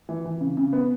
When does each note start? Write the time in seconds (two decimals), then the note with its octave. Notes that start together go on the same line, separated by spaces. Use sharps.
0.09 E3
0.26 E3
0.41 C#3
0.57 C#3
0.73 B3